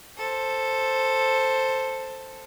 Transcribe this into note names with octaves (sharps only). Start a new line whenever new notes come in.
A4 C5